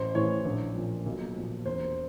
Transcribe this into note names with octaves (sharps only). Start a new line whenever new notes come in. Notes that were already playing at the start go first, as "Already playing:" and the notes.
Already playing: A1 C5
A2 E3 C#5
A#1
A#2 F3
B1
A#2 F3
E1 C5